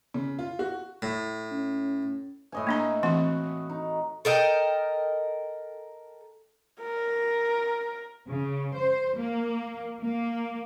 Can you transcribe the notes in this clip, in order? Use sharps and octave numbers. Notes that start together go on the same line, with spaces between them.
C#3
F4
F#4
A2
C#4
A2 D#5 G#5
A#3 D4 A#5
E3 C4 F#4 F#5
D#4
A4 A#4 D#5 G5
A#4
C#3
C5
A#3
A#3